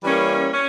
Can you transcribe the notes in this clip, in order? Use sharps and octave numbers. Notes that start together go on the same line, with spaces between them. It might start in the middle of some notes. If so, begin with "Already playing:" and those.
E3 G3 A#3 C#4
C#4